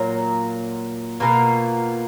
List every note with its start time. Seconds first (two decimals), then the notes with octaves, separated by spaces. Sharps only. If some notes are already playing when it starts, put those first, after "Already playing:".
Already playing: A#2 F#3 A#3 F4
1.20 B2 A#3 F4 A#4